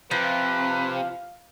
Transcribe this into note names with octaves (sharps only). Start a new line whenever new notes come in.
C3 F3 B4 F5